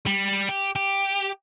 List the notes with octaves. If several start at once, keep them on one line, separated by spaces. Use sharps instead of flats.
G3
G4
G4